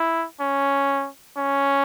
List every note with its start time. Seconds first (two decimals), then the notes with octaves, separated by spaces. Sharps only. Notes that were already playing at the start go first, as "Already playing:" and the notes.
Already playing: E4
0.40 C#4
1.37 C#4